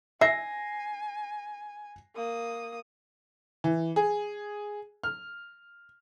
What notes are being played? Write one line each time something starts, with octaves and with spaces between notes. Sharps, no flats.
E5 G#5 A#6 C7
A#3 D#6
E3
G#4
F6